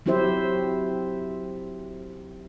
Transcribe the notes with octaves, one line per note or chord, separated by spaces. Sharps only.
F#3 C4 E4 G4 C5 E5